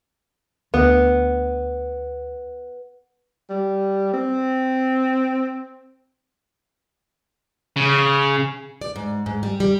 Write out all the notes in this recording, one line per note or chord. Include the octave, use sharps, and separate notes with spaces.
D2 B3
G3
C4
C#3
D5
G#2
G#2
G3
G3